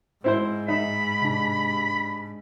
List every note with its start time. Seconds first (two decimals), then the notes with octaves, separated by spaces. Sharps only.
0.24 G#2 C4 E4 C5
0.68 D#4 E5 B5
1.22 C3 D4